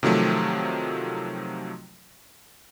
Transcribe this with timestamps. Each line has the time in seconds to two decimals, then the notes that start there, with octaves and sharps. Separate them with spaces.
0.03 C3 D#3 F3 F#3 A3